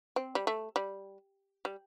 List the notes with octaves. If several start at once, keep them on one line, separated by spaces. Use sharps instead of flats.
C4
G3
A3
G3
G3